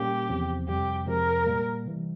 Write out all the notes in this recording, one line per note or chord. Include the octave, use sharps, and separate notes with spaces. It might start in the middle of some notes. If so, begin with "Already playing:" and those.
Already playing: A#2 G3 A#3 C#4 G4
E2 C3 F3 C4
F2 C3 G3 G4
F2 C3 F3 G#3 A#4
A#2 G3 A#3
C3 E3 G3